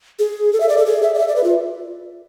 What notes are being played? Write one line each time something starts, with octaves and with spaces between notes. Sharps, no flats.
G#4
A4
E5
D5
A4
G#4
E5
D5
E5
D5
B4
F4